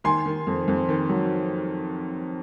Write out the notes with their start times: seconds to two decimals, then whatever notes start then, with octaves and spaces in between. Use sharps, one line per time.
0.04 D#3 G#5 C6
0.26 D#3
0.47 F2
0.68 F2
0.89 D#3
1.09 F#3